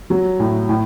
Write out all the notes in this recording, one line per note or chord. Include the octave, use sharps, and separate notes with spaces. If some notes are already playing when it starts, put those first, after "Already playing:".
F#3
A2
A2